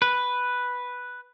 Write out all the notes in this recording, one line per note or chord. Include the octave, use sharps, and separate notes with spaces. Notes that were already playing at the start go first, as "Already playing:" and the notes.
B4